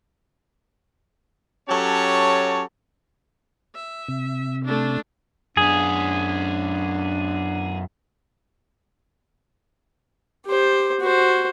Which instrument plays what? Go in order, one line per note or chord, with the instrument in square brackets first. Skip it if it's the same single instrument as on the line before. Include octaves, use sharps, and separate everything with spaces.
[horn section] F#3 C#4 G4 A4 C#5 A5
[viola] E5
[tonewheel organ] C3
[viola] A3 D4
[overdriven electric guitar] F#2 B3 [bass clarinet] D4 [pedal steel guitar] G#4
[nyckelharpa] G4 C5
F#4 C5